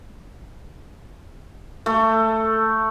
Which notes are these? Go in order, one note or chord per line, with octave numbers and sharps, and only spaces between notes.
A3